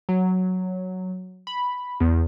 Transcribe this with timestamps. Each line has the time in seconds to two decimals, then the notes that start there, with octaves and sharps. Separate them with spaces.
0.09 F#3
1.47 B5
2.00 E2